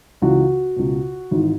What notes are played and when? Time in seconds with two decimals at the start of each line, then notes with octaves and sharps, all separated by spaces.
0.22 C#2 C#3 E3 F#4
0.76 C#2 B2
1.31 G#1 G#2 E3